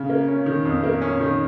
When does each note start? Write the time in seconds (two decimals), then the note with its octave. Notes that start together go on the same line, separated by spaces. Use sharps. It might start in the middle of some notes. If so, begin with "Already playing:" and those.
Already playing: C#3
0.09 A#3
0.28 C#4
0.46 D#3
0.65 F2
0.83 A#3
1.02 C#4
1.21 D#3